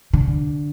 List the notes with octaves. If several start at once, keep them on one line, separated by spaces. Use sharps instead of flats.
D3